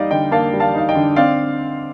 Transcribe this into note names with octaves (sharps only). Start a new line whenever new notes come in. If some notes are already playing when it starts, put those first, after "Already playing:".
Already playing: G3 D#4 D5 D#5 F5
D3 D#5 G5
A#3 F5 A5
G3
F5 A5
D#4 F5
D#5 G5
D3
C4 D5 F5